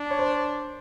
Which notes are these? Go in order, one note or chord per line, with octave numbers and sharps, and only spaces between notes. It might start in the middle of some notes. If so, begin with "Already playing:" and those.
Already playing: D4
C#5
C5